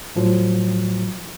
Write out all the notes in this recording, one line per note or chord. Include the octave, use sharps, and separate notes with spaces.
A2 F3 F#3